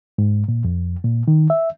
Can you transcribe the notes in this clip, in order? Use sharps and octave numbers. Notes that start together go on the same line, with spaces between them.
G#2
A#2
F2
A#2
D#3
E5